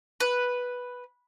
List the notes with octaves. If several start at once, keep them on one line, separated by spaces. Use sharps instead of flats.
B4